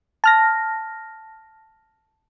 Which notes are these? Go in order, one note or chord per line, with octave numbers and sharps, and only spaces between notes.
A5 F6 A#6